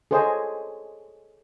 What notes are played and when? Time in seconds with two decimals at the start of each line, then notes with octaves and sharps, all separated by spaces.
0.11 G#4 A4 C5 C#5 D#5 G#5